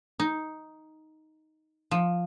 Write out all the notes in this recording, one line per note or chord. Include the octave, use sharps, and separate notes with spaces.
D#4
F3